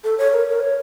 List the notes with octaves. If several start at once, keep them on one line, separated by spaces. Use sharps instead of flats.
A4
C#5
A#4
A#4
C#5